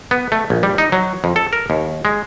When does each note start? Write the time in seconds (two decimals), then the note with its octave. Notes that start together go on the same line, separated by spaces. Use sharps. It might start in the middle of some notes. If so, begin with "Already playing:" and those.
0.11 B3
0.32 A3
0.50 A#1
0.63 G3
0.78 D#4
0.92 F#3
1.24 F2
1.36 A4
1.53 A#4
1.70 D#2
2.05 G#3